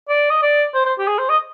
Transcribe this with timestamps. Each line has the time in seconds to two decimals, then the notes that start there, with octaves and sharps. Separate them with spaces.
0.09 D5
0.30 D#5
0.42 D5
0.74 C5
0.85 C5
0.99 G4
1.07 G#4
1.18 C5
1.29 D#5